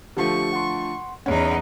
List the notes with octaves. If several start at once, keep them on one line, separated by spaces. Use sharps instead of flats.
D3 F3 A3 G4 C#6
F#5 C6
E2 C#4 D#4 C#5 F#5